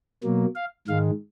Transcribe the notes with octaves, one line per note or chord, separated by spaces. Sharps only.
B2 F#3 A#3
F5
G#2 D#3 G#3 F5